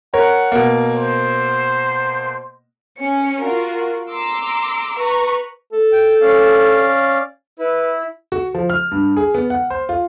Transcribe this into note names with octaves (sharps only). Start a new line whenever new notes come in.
A#4 C#5 F#5
B2 A#3
C5
C#4 C#7
F4 F#4 A#4
A#5 C6 D6 E6
B4 A#5 C#6
A4
G5
C#4 D5 F5
E4 B4
F#4
F3
F6
G2
G#4
B3
F#5
C5
F4